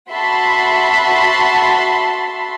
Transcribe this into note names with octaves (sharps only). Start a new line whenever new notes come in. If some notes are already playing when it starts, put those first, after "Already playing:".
F#4 E5 A5 B5 C6